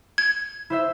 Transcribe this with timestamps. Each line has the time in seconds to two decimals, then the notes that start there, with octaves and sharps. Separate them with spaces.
0.18 G#6
0.70 E4 C5 E5